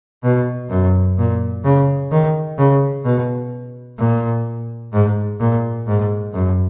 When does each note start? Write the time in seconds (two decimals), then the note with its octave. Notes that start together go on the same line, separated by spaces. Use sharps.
0.23 B2
0.70 F#2
1.18 A#2
1.64 C#3
2.11 D#3
2.58 C#3
3.05 B2
3.98 A#2
4.93 G#2
5.40 A#2
5.87 G#2
6.33 F#2